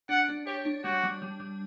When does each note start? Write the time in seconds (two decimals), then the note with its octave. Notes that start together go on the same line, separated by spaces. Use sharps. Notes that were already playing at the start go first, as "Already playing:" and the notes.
0.09 D4 F#5
0.29 D4
0.46 G4 C#5
0.65 D4
0.84 G3 F#4
1.03 G3
1.22 G3
1.40 G3